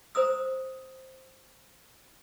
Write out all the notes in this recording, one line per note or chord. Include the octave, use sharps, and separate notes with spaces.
C5 A#5 D#6 E6